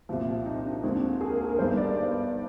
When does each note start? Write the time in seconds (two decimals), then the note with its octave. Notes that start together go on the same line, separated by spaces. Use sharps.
0.09 C2 A#2 F3
0.46 D#4
0.65 D4
0.83 D#2 D3 G#3 C4
1.21 G#4
1.30 A#4
1.41 G#4
1.49 A#4
1.59 G1 G2 D#3 G3 C5
1.77 D5